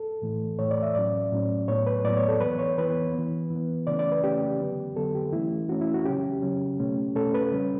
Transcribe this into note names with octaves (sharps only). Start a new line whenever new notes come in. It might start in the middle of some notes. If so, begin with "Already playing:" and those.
Already playing: A4
A2 E3 A3
A2 E3 A3 C#5
D5
E5
A2 F#3 C#4 D5
A2 F#3 C#4
A2 F#3 B3 C#5
B4
A2 F#3 B3 D5
C#5
A4
E3 B3 B4
C#5
E3 B3 B4
E3 B3
E3
B3
C#3 E3 A3 C#4 D5
D5
B4
C#3 E3 A3 C#4 G4
D3 F#3 B3
D3 F#3 B3 A4
G4
E3 A3 C#4 E4
E3 A3 C#4 F#4
E4
F#4
C#3 F#3 C#4 G4
C#3 F#3 C#4
B2 A3 C#4
B2 A3 C#4 A4
B4
C#3 G3 C#4